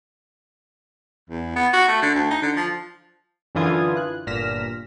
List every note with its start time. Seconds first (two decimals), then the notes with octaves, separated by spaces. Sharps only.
1.30 E2
1.56 B3
1.73 F#4
1.88 A3
2.02 D3
2.15 D2
2.30 D#4
2.42 D3
2.56 F3
3.55 F#2 D3 E3 F4 D#6 G#6
3.97 F#6
4.26 G1 A#2 F6 A#6 B6 E7